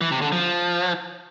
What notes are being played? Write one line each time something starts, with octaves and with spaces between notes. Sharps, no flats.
E3
C3
D3
F3